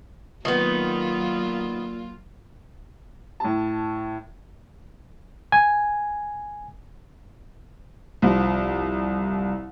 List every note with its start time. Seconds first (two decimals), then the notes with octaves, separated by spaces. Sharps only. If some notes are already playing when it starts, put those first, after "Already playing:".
0.45 A#2 D#3 F#3 B3 F4
3.40 A2 A5
5.52 G#5
8.22 C2 F3